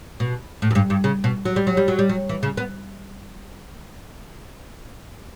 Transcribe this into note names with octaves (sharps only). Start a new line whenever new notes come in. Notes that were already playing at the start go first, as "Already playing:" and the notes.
B2
A2
F#2
G2
G2
C#3
B2
F#3
G3
F#3
G3
F#3
G3
F#3
E3
C#3
B3